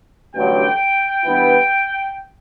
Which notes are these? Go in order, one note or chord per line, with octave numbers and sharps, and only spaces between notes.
A1 G2 D3 F#3 G5
G2 E3 B3 E4